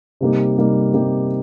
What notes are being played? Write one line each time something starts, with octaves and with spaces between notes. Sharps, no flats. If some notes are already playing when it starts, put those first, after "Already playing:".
C3 G3 A#3 D#4 G4
C3 G3 A#3 D#4 G4
C3 G3 A#3 D#4 G4